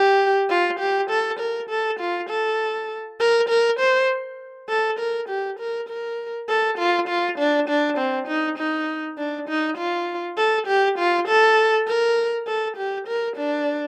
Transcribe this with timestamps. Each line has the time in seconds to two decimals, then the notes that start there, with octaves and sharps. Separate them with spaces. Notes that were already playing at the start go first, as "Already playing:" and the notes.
Already playing: G4
0.49 F4
0.80 G4
1.10 A4
1.40 A#4
1.70 A4
2.00 F4
2.30 A4
3.20 A#4
3.49 A#4
3.80 C5
4.69 A4
4.99 A#4
5.29 G4
5.60 A#4
5.89 A#4
6.49 A4
6.78 F4
7.08 F4
7.39 D4
7.69 D4
7.98 C4
8.28 D#4
8.58 D#4
9.18 D4
9.49 D#4
9.78 F4
10.38 A4
10.67 G4
10.98 F4
11.28 A4
11.87 A#4
12.47 A4
12.77 G4
13.08 A#4
13.37 D4